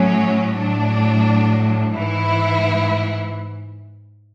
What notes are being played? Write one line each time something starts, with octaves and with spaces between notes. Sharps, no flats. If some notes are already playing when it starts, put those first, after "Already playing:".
Already playing: A2 F#3 C#4
A2 F#3 D4
G#2 E3 E4